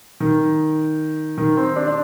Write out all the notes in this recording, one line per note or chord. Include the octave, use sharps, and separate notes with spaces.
D#3
D#3
C4
D4
D4